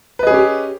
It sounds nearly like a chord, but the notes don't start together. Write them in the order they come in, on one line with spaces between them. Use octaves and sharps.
B4 D#5 G#4 C#4 G4